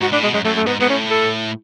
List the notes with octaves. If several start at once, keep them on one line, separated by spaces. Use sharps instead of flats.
G#2 F#4
A2 D4
B2 G#3
F#2 G#3
F#2 A3
A3
G#2 B3
G#2 B3
A2 C#4
A4